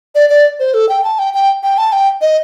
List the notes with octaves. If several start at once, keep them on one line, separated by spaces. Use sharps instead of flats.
D5
D5
C5
A4
G5
A5
G5
G5
G5
A5
G5
D#5